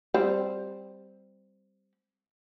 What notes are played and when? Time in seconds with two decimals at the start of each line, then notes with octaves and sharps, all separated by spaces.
0.14 G3 C4